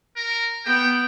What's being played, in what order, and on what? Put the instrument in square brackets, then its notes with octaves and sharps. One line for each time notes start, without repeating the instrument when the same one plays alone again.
[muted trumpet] A#4
[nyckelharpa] B3 [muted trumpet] G5